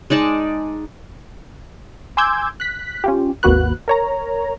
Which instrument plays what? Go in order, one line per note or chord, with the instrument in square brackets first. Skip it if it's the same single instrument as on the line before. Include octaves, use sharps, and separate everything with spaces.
[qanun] G#3 D#4 D5 A5
[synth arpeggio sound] G#5 C6 D6 E6 G6 G#6
F#6 B6
C#4 F4 G4
G#1 D#2 A#3 F#4 B4 F#6
A#4 C#5 A#5